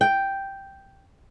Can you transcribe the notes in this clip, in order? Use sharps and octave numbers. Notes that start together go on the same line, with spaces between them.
G5